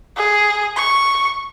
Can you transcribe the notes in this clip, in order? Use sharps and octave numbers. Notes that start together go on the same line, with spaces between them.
G#4
C#6